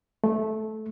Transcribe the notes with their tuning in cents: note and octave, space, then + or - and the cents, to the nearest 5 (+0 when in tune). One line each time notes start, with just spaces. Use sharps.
A3 -15